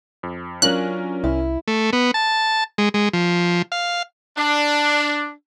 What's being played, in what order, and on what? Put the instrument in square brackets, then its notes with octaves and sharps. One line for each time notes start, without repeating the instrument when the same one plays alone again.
[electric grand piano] F2
[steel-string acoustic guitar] F#3 D4 F4 [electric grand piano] C#4 A#4 [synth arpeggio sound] F#6
[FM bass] C2 [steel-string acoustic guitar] E4
[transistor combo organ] A3
B3
A5
G#3
G#3
F3
F5
[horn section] D4